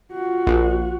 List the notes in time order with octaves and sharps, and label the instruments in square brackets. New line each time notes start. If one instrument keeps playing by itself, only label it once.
[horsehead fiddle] F4 F#4
[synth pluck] A#1